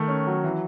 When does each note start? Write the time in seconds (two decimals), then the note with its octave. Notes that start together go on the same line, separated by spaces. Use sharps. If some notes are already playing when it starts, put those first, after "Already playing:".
Already playing: D#3 A3
0.08 C#4
0.27 F#3
0.44 E3